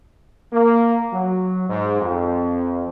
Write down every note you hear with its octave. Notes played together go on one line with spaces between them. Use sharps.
A#3
F#3
G#2
F2